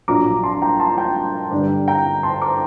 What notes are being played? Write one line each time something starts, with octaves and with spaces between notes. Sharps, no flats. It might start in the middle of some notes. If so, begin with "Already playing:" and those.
A#1 A#2 F#3 A#5 D6
A5 C6
G5 A#5
A5 C6
G5 A#5
G2 D3 G3 D4
G5 A#5
A5 C6
A#5 D6